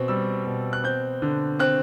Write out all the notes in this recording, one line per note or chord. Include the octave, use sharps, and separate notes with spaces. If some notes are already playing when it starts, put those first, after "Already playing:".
Already playing: B2 C4
G3 E6
B2
F#6
C4 G6
D3
C4 F#6